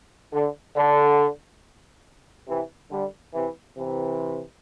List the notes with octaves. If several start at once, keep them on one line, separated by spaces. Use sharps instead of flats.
D3
D3
C3 E3
D3 G3
C3 E3
C3 E3